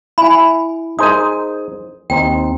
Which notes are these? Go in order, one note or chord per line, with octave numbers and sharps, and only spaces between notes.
E4 G#5 B5
D#4 G#4 A#4 C5 D#6
D#2 C4 D#4 G5